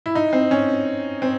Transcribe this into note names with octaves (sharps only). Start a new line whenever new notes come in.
E4
D#4
C4
C#4
C4